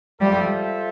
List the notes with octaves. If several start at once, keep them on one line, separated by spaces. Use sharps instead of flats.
G3 F4 A4 C5 E5